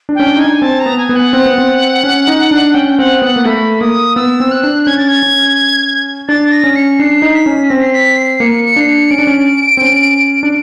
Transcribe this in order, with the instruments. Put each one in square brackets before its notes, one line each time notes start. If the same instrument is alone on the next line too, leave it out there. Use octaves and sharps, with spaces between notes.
[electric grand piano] D4
[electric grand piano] C#4 [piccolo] G5
[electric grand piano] D4
[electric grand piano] D#4 [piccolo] G#5
[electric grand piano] D4
[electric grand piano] C4 [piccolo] A5
[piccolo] A#5
[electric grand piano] B3
[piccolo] G#5
[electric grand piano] B3
[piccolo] F#5
[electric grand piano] C4
B3
C4
C#4
D#4
D4
[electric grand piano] C#4 [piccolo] G5
[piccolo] G5
[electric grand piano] C4 [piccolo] F#5
[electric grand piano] B3 [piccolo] F#5
[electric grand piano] A#3
[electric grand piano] A3 [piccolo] B5
[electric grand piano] A#3 [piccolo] D#6
[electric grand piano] B3 [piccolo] E6
[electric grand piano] C4
[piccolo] F#6
[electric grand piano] D4
[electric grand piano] C#4 [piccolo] G#6
[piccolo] A6
G#6
[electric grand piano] C#4
[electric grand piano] D4 [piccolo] A6
[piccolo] A#6
[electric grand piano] C#4
[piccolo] C#7
[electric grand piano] D4 [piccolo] C7
[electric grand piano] D#4
[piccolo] B6
[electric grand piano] C#4
[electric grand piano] C4 [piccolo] A#6
[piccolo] C7
B6
C7
[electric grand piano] A#3 [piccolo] C#7
[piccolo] C#7
[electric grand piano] D4 [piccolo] C7
[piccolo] C#7
[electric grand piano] C#4 [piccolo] D7
[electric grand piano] D4
C#4
C4
C#4
D4